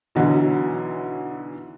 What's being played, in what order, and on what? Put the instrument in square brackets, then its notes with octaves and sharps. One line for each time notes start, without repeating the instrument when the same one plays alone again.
[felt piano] B1 D3 E3 F#3